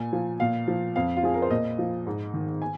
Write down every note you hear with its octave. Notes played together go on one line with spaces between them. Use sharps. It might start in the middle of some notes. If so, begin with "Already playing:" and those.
Already playing: A#2 G#5
F3
A#2 F5
F3
F2 F5
F4
F3 G#4
A#4
C5
A#2 D#5
F3
G#2
D#3
G#5